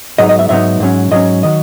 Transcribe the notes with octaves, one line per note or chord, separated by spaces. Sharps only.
G#2 F#3 B3 D#4 D#5
D#5
E5
G#2 F#3 B3 D#4 E5
G#2 F#3 C#4
G#2 F#3 C#4 D#5
D#3 F#3 D#5